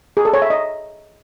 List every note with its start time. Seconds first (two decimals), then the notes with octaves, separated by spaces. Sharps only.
0.17 G#4
0.25 A4
0.34 C#5
0.42 E5
0.50 D#5